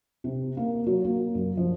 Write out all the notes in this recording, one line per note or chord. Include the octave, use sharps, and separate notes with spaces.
C3
A#3
F#3
A#3
F#2
F3